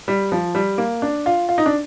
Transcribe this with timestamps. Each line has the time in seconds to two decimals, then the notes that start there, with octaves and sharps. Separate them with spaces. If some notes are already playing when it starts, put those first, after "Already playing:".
0.08 G3
0.32 F3
0.55 G3
0.78 A#3
1.02 D4
1.26 F4
1.49 F4
1.58 D#4
1.66 D4